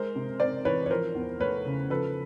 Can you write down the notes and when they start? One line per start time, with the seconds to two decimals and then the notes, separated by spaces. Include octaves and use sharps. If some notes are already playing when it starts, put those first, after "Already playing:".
Already playing: G#3 A#4 C5
0.16 C3
0.40 C4 C5 D5
0.65 E3 B4 C#5
0.86 C#5
0.90 F3 A#4 C5
1.15 E2
1.40 A3 B4 C#5
1.66 C#3
1.90 F3 A4 B4